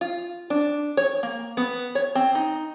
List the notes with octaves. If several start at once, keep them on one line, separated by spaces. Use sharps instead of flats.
F4
D4
C#5
A#3
B3
C#5
C4
D#4